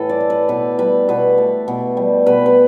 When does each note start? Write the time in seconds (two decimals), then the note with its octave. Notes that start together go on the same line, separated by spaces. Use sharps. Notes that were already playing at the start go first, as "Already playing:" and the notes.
Already playing: A2 E3 A4 B4
0.09 D5
0.20 A3
0.30 B4
0.49 B2 B4
0.79 G3 B4
1.09 B2 B4
1.38 A3
1.68 B2
1.97 G3
2.27 B2 B4
2.46 B4